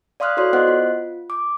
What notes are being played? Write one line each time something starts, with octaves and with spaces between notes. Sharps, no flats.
D5 F5 C6 D#6 F6 F#6
E4 F#4 A4 C#5 D5 C6
B3 C5 D#5 F#5 F#6
F4
D6